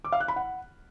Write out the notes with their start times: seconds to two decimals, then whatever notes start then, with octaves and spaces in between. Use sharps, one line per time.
0.05 D6
0.12 F5
0.20 F#6
0.28 B5
0.36 F#5